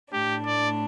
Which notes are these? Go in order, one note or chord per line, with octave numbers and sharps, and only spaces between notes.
A2 A3 D4 G4
D5